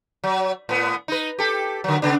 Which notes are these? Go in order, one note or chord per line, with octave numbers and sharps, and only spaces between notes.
F#3
A2 B3
D#4 B4
G4 A4
D3 F#3
C#3 B3 D4